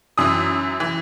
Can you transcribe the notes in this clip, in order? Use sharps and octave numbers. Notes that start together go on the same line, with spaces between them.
F#2 E3 D#6
E3